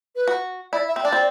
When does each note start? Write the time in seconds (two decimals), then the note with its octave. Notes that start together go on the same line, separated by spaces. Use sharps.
0.16 B4
0.27 F#4
0.73 E4 D5
0.88 E5
0.96 C4
1.03 D4 D5
1.12 C4